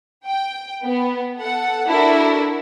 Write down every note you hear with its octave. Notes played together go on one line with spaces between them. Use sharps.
G5
B3
A4 F#5
D4 E4 F#4 A4 A#4